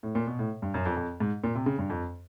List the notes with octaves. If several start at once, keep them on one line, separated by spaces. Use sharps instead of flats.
A2
A#2
B2
A2
G2
F#2
F2
F2
G#2
A#2
C3
C#3
G2
F2